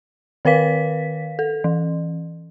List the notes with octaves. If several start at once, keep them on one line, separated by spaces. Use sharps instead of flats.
D#3 A#4 B4 F5 B6
A4
E3